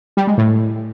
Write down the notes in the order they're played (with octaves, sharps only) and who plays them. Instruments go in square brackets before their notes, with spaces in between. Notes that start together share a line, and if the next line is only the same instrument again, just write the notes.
[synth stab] G3
G#3
A2